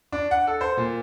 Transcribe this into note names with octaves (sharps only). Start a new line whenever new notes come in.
D4
F#5
A4
C5
A#2